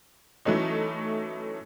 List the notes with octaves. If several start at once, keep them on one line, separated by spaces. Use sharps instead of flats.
E3 F#3 A3 C#4 D#4